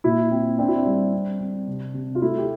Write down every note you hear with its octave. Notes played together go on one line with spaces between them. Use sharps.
A#2 E4
C4
C4 D4
E4
D4
G3
C4
C4
C3
C3
F4
A3 E4
G4